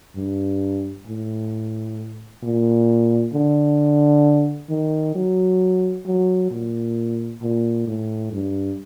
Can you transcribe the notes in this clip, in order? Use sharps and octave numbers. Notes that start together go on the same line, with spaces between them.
G2
A2
A#2
D3
D#3
F#3
F#3
A#2
A#2
A2
G2